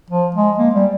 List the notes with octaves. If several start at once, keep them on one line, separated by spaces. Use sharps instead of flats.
F3
G#3
A#3
G3